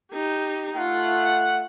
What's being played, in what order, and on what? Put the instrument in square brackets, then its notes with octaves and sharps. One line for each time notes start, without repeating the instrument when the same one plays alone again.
[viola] D#4 G4
[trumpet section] A3 F#5 [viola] F4